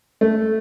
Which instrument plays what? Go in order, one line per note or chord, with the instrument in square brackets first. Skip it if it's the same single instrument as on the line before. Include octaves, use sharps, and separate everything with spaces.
[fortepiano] A3